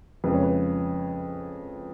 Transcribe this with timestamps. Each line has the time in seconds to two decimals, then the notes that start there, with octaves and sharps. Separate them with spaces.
0.24 F2 C#3 G#3 B4
0.34 C#5
0.43 B4